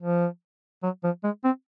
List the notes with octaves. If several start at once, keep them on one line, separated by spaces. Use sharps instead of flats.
F3
F#3
F3
G#3
C4